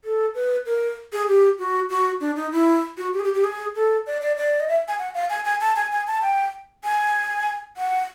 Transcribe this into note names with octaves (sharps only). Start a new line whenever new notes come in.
A4
B4
A#4
G#4
G4
F#4
F#4
D4
D#4
E4
F#4
G4
G#4
G4
G4
G#4
A4
D5
D5
D5
D#5
E5
G#5
F#5
F5
G#5
G#5
A5
G#5
G#5
A5
G5
G#5
F#5